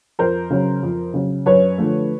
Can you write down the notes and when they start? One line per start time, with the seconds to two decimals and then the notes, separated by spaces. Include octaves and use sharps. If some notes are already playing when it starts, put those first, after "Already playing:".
0.19 F2 A#4 C5
0.50 C#3 F#3
0.83 F2
1.14 C#3 F#3
1.46 F#2 B4 C#5
1.78 D3 F3 A3